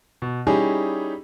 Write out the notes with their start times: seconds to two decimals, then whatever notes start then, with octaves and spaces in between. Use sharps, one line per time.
0.22 B2
0.47 G3 C#4 D#4 E4 G4 G#4